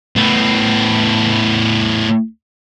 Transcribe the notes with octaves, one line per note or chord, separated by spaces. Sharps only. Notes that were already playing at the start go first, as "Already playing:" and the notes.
A2 B3